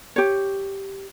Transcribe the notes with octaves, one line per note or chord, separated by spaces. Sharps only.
G4 C#5